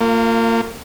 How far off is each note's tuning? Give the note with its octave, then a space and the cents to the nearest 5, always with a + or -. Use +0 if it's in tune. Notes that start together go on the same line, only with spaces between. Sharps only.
A#3 -35 F4 +0